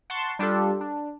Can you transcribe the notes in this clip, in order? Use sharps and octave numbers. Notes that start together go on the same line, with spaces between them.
F#5 A5 C6 C#6
G3 D4 F4 G4 A4
D4